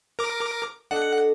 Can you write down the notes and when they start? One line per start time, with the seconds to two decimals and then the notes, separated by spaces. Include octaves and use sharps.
0.19 A#4 D6
0.91 D4 A4 D#5 F#5